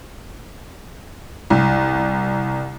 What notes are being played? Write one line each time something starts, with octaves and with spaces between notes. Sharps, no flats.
C2